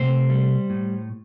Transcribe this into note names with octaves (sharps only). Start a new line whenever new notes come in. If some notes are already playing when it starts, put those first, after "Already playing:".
Already playing: C3 A3 C5
G3
A2